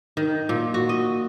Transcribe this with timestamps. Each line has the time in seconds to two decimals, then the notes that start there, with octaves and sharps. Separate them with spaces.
0.17 D#3
0.49 A#2
0.74 F#4
0.89 D#5